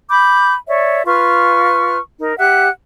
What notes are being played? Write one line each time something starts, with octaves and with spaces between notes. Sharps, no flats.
B5 D6 G6
C#5 D5 E5
F4 B4 C#6 F6
D#4 A#4
G4 E5 F#5 F#6